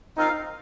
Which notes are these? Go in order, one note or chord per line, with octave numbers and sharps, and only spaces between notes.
C4 D#4 F4 A#4 F5